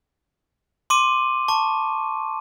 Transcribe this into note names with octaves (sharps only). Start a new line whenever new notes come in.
C6 D6 D#7
A5 C#6